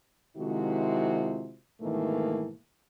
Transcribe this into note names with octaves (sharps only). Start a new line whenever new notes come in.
C3 D#3 F3 G#3 E4 F#4
G#2 B2 D#3 E3 A3 A#3